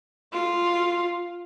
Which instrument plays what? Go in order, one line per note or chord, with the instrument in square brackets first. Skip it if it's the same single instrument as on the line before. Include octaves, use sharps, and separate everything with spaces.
[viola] F4